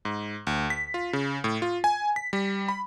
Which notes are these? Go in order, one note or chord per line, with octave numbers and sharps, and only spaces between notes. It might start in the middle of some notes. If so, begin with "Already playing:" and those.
G#2
D2
B6
F4
C#3
A2
F4
G#5
B6
G3
B5